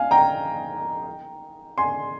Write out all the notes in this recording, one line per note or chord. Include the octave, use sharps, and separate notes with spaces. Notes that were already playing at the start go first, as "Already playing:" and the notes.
Already playing: F5 G#5
G5 A#5
G#5 C6